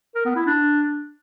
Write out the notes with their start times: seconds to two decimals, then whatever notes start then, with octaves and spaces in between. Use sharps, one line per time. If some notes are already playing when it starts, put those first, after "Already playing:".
0.15 A#4
0.26 B3
0.36 E4
0.46 D4